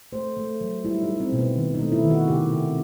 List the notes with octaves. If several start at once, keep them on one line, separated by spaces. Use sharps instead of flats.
A3 C5
A3
F#3
G3 E4
D#4
G3
C4
B2
B3
D#3
D#4
A3
E4
D#3
F#4
C3 G4
C3